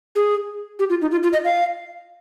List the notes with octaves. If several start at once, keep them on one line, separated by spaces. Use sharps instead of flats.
G#4
G4
F4
D#4
F4
F4
D#5
F5